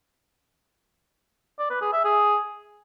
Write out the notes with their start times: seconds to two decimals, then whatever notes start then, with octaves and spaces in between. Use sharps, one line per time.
1.59 D5
1.70 B4
1.82 G#4
1.93 E5
2.05 G#4